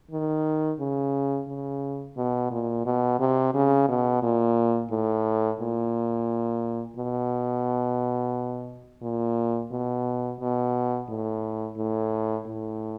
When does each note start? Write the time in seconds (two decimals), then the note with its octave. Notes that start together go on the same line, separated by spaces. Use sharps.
0.11 D#3
0.79 C#3
1.48 C#3
2.17 B2
2.51 A#2
2.86 B2
3.19 C3
3.54 C#3
3.88 B2
4.23 A#2
4.91 A2
5.60 A#2
6.96 B2
9.02 A#2
9.71 B2
10.40 B2
11.08 A2
11.77 A2
12.46 A2